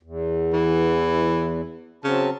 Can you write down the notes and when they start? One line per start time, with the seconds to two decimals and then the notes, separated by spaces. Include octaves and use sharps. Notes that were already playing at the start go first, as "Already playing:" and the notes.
0.03 E2
0.53 E3
2.04 C#3 F#3 C4 A5